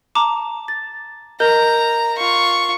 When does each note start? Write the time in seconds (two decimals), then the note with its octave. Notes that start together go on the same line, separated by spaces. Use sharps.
0.15 A5 A#5 D6
0.68 A6
1.40 A#4 D#5 A#5 G6
2.17 F4 C#6